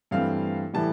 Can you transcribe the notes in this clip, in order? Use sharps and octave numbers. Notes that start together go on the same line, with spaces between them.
G2 E3 A3 C4 F5
A2 E3 G3 A5